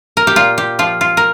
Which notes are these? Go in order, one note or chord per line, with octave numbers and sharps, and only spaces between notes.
A#4
G4
A#2 F4
G4
F3 F4
F4
A#4